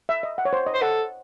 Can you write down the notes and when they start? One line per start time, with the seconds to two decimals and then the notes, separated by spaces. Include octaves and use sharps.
0.09 E5
0.23 D#5
0.38 F#5
0.45 C#5
0.53 C5
0.66 D#5
0.74 C5
0.82 A4 F#5